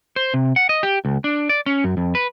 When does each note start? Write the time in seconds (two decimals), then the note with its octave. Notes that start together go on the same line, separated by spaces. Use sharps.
0.16 C5
0.34 C3
0.56 F#5
0.69 D#5
0.83 G4
1.05 C#2
1.24 D4
1.49 D5
1.66 C#4
1.84 F#2
1.97 F2
2.15 B4